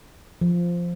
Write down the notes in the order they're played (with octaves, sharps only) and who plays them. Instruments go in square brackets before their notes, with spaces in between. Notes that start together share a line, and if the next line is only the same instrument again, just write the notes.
[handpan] F3